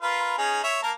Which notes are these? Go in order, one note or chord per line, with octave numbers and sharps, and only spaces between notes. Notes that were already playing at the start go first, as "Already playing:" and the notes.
F4 A#4 B4
C#4 D#4 G#4
C#5 E5
A#3 A#4 A5